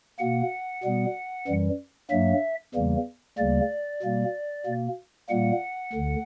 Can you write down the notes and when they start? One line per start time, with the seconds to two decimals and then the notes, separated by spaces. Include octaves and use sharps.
0.19 B2 A#3 F#5
0.83 B2 G3 B3
1.47 F#2 E3 G3
2.11 G2 F#3 A#3 E5
2.74 E2 C#3 E3 G3 A#3
3.38 D2 C#3 G3 A#3 D5
4.02 B2 G3 A#3
4.66 B2 A#3
5.29 A#2 G3 A#3 F#5
5.93 D2 D3